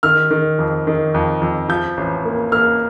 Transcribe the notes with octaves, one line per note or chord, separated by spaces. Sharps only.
D#3 F6
D#3
F2
D#3
F2
F2
F3 G6
A1
A#3
A#3 F6